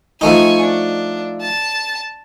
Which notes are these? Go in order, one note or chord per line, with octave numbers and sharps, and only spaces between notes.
F3 A3 D#4 G#5 C#6
D4
A5